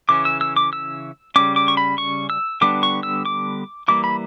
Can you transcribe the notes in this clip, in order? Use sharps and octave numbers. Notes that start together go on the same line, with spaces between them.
C#3 E3 C#4 D6
E6
E6
D6
E6
C#3 G3 C#4 D6
D6
C#6
B5
C#6
E6
D3 G3 B3 D4 D6
C#6
E6
D6
E3 G3 A#3 D6
B5